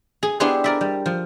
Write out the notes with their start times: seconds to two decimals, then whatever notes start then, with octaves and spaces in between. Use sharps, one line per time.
0.23 G#4
0.40 B3 D4 E4 G4 G#4 C5
0.64 A#4 D5 E5
0.81 G3
1.06 F3